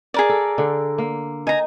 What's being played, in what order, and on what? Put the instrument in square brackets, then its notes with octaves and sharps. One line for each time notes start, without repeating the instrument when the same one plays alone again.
[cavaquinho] G#4 A#4 D5
[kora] A4
D3
A#3
[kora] D#4 [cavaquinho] G#5 A#5